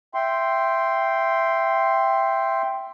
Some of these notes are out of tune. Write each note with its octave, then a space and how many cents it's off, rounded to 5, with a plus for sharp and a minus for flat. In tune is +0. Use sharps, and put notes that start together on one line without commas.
E5 +10 G5 +0 C6 +0